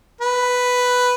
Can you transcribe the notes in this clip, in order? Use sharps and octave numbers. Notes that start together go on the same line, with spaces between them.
B4